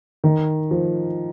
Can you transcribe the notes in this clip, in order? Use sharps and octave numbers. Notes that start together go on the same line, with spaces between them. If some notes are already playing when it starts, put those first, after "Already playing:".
D#3
F3